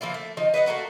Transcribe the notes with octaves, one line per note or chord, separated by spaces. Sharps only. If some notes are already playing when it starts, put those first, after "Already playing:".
F3 A#3 E4 F4
A3
F3 D#4 D#5
B4 D#5 E5 F#5
A3 A#3 F#4 B4